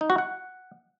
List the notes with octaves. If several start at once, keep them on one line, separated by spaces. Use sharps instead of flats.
D#4
F#4
F#5